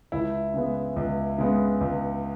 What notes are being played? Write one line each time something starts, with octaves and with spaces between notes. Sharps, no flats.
C#2 E4 E5
C#3 G#3 B3
C#2
C#3 G#3 B3
C#2